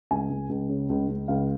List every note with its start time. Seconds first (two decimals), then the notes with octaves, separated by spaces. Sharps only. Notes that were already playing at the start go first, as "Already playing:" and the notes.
0.11 C#2 G#5
0.30 C#2
0.49 C#2
0.69 C#3
0.89 C#2
1.08 C#2
1.28 C#2 F5